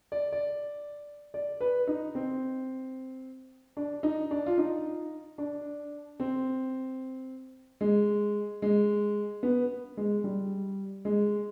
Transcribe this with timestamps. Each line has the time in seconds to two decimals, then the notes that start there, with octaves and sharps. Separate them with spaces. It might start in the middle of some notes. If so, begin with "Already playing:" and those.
0.12 D5
0.32 D5
1.34 D5
1.61 B4
1.87 D#4
2.15 C4
3.77 D4
4.03 D#4
4.31 D4
4.46 F4
4.58 D#4
5.38 D4
6.20 C4
7.81 G#3
8.62 G#3
9.43 B3
9.97 G#3
10.24 G3
11.05 G#3